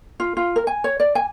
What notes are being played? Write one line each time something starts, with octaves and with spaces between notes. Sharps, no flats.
F4
F4
A#4
G#5
C#5
D5
G#5